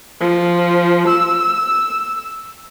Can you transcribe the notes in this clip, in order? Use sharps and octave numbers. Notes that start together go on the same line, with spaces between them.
F3
E6